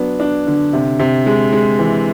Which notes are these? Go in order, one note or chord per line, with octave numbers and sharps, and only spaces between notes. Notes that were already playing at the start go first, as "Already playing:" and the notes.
Already playing: F#3 B3 D4
D4
D3
C3
C3
G#3
G#3
E3